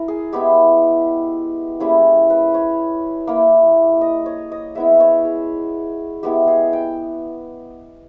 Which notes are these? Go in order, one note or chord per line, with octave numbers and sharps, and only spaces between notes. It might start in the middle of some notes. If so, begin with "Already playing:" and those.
Already playing: E4 A#4
G#4
G#3 B3 E4 G4
G3 A#3 C#4 E4 G#4
B4
C#5
A#3 E4
D#5
C#5
D#5
G#3 B3 E4 E5
C#5
G#4
G#3 B3 E4 G4
G#4
G5